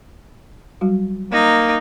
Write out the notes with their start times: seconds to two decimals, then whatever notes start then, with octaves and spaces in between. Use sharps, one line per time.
0.81 F#3 G3 F#4
1.32 A#3 D#4